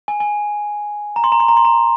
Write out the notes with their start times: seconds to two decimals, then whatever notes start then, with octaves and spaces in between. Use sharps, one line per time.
0.08 G#5
0.20 G#5
1.16 A#5
1.24 C6
1.32 A#5
1.40 C6
1.48 A#5
1.57 C6
1.65 A#5